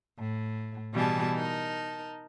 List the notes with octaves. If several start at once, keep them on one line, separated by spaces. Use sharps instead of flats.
A2
B2 E3 G3 G#4 A5
D#4 A#4 A5